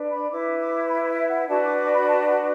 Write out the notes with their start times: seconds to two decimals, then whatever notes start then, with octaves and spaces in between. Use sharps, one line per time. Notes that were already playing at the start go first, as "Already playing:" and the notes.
Already playing: D4 B4
0.10 B5
0.30 E4 B4 D6
0.60 D6
0.89 B5
1.08 E5
1.29 F#5
1.48 D4 F#4 B4 A5
1.63 D6
1.78 D6
1.93 B5
2.08 A5
2.27 F#5